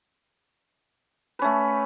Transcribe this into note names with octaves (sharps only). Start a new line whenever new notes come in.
A3 C#4 B4